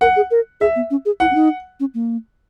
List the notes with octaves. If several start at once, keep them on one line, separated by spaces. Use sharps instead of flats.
A#4 F#5
G#4
A#4
G#4 E5
B3
C#4
G#4
E4 F#5
C#4
D#4
C#4
A#3